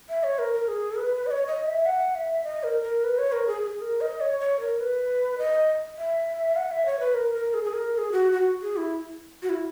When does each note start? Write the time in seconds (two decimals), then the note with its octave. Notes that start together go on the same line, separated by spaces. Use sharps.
0.09 E5
0.23 C#5
0.39 A#4
0.53 A#4
0.68 G#4
0.97 B4
1.26 D#5
1.31 C#5
1.47 D#5
1.66 E5
1.86 F#5
2.15 E5
2.44 D#5
2.63 A#4
2.83 A#4
3.04 B4
3.18 C#5
3.32 A#4
3.47 G#4
3.63 G#4
3.81 A#4
4.01 D#5
4.21 C#5
4.40 C#5
4.60 A#4
4.80 B4
5.38 D#5
5.97 E5
6.56 F#5
6.71 E5
6.86 C#5
7.00 B4
7.14 A#4
7.34 A#4
7.54 G#4
7.64 G#4
7.73 A#4
7.94 A#4
7.98 G#4
8.12 F#4
8.32 F#4
8.62 G#4
8.77 E4
9.43 F#4
9.49 E4